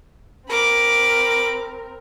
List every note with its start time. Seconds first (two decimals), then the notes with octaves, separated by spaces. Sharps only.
0.48 C4 A#4 B5 D6